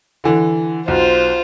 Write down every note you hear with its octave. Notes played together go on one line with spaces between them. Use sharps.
D3 E3
B1 F4 C5